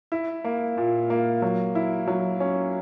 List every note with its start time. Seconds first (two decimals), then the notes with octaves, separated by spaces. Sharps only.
0.12 E4
0.44 A#3
0.78 A#2
1.10 A#3
1.42 F#3
1.75 E4
2.08 F#3
2.40 C#4